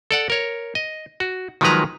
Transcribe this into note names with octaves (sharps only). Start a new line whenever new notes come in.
A4 D5 F#5
A#4 C#5
D#5
F#4
D#3 F3 F#3 G#3 B4 A#5